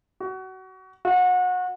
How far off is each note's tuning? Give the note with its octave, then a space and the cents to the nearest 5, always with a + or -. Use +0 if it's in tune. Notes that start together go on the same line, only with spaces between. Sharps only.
F#4 +25
F#4 -30